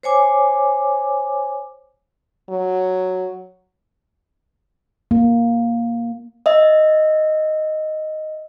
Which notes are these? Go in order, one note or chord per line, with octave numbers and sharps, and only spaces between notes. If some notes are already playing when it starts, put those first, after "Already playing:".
C5 C#5 G#5 D6
F#3
A#3
D#5 E5